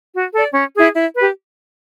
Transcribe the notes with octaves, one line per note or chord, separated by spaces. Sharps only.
F#4
A4 D5
C#4
E4 G#4
E4
G4 B4